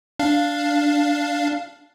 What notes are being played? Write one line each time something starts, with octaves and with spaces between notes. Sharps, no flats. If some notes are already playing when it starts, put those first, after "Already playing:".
D4 F5